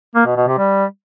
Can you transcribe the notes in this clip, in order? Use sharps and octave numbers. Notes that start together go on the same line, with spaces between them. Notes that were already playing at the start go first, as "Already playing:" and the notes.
A#3
B2
B2
C3
G3